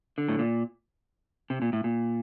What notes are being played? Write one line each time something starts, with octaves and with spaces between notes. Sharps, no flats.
D3
A2
A#2
C3
A#2
A2
A#2